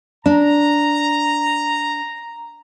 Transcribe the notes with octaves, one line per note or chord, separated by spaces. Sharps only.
D4 A#5